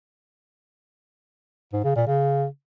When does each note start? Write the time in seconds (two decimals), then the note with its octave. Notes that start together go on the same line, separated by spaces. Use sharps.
1.73 G#2
1.84 C#3
1.96 A#2
2.07 C#3